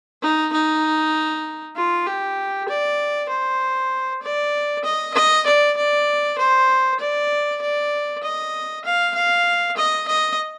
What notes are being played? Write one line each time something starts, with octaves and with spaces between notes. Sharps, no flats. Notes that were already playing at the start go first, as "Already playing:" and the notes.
D#4
D#4
F4
G4
D5
C5
D5
D#5
D#5
D5
D5
C5
D5
D5
D#5
F5
F5
D#5
D#5